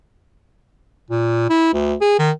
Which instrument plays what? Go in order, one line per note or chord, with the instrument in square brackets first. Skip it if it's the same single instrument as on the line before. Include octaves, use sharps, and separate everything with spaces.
[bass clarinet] A#2
E4
D2
G#4
D#3